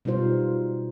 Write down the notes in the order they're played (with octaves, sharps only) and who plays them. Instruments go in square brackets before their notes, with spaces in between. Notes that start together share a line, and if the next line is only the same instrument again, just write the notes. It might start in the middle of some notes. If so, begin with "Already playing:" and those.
[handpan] B2 G3 D#4 F4 C5